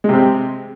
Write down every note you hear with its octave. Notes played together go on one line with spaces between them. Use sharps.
C3 G#3 C4